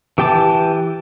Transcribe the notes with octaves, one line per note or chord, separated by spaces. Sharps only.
E3 G4 G5 A5 D6